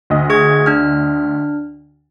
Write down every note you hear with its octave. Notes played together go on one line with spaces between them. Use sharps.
D2 D#5
G#4 C#6 G#6
D4 F6